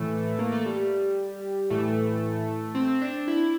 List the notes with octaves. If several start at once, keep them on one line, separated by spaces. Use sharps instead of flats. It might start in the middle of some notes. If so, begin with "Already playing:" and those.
Already playing: A2 E3 A3
A#3
A3
G3
A2 E3 A3
C4
D4
E4